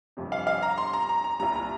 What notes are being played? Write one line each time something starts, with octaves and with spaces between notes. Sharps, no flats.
G1 F2 C3
F5
F5
A#5
C6
A#5
A#5
A#5
C2 A#2 G3 A#5
A#5